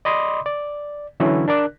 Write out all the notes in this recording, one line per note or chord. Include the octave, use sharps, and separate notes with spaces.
D5 D#5 B5 C6 D6 D#6
D5
D3 E3 F#3 C#4 D4 E4
D4 A#4 D5 F#6